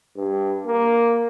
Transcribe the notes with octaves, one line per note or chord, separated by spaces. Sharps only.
G2
A#3